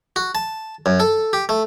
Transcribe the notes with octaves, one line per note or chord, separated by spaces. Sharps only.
F#4
A5
F#2
A4
G4
A3